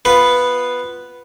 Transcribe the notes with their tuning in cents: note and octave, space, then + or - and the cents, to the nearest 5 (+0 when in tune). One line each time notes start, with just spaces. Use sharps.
B3 +0 F4 +0 B4 +0